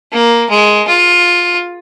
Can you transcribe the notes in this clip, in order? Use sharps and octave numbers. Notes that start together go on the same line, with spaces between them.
A#3
G#3
F4